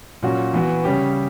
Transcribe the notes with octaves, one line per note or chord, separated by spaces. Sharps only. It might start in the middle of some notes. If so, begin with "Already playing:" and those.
A#2 F#3 C#4 F#4
E3 B3 F#4
C#3 G3 C#4 G4